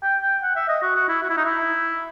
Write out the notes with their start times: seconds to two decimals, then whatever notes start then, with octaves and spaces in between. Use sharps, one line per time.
0.02 G5
0.22 G5
0.43 F#5
0.56 E5
0.69 D#5
0.82 F#4
0.96 F#4
1.08 E4
1.22 F#4
1.30 E4
1.37 D#4
1.45 E4